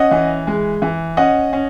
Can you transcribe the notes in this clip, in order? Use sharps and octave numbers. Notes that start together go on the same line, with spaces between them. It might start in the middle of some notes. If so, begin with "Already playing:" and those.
Already playing: C#4 D#5 F#5
E3
G#3
E3
C#4 D#5 F#5
C#4